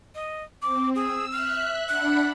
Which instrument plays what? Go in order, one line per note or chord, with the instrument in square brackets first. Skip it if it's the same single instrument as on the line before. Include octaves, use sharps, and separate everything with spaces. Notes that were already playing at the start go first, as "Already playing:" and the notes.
[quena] D#5
[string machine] C4 [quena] D6
[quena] G#4 [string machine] E6
[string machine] E5 F#6 [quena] F6
[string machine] D4 F#5 B5 [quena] F#6